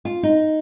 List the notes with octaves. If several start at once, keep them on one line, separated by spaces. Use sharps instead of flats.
F4
D#4